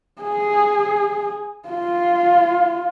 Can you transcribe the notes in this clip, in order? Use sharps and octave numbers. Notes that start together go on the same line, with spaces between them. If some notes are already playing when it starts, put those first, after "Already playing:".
G#4
F4